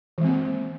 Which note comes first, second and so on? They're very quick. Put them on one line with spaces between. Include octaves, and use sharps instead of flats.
E3 G#3 C4 A#3